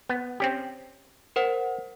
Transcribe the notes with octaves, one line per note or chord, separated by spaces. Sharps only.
B3
C4 C#4 G4
A#4 C5 F#5